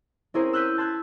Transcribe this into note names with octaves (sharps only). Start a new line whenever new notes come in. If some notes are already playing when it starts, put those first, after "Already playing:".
C4 C#4 E4 G#4 A#4 C5
E6 F#6 G6 B6 D#7
A5 C6 E6 F#6 G#6